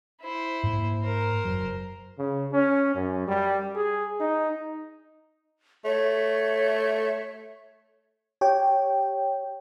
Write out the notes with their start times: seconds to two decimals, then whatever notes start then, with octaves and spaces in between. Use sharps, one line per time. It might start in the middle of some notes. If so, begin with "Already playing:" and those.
0.21 E4 C5
0.64 G#2 A#3
1.02 A#4 C5
1.45 F#1 F#3
2.18 C#3
2.52 C#4
2.95 F#2
3.28 G3
3.75 G#4
4.20 D#4
5.85 A3 C#5
8.41 G4 C#5 G5